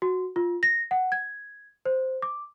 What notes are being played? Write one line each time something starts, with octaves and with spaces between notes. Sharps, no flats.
F#4
F4
A#6
F#5
G#6
C5
D6